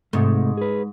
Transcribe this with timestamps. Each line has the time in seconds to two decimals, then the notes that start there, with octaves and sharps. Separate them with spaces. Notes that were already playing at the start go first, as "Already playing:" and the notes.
0.13 G#2 C3 A3
0.57 G#4 B4